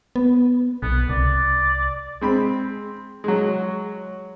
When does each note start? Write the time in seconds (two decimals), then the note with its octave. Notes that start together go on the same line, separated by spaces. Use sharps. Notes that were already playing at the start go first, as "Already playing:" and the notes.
0.16 B3
0.83 B1 B3
1.10 C2 D5
2.21 G#3 C4 B5
3.24 F#3 G#3